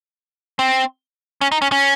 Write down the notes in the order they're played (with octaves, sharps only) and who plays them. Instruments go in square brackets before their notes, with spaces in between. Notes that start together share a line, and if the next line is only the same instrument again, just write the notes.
[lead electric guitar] C4
C#4
D#4
C#4
C#4